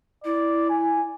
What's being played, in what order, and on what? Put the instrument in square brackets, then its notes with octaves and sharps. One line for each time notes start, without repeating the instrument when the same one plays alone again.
[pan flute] E4 [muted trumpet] D5
[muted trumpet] G#5